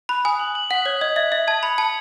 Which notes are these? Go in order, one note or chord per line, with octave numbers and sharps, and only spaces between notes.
B5 F#6
G#5 D#6
F#7
F#7
F#5 B6
C#5 G#6
D#5 G#6
E5 G#6
E5 B6
A5 G#6
B5 C#7
A5 C#7